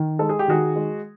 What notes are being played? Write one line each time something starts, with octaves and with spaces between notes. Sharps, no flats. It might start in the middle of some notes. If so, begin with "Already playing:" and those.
Already playing: D#3
G#3 A4
G#4
G4
D#3 F#4 G#4
G#3